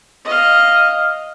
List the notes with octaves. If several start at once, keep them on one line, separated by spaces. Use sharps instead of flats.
D#5 F5